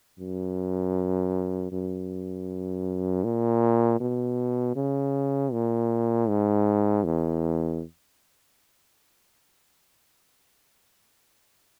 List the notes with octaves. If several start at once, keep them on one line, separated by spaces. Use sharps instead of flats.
F#2
F#2
A#2
B2
C#3
A#2
G#2
E2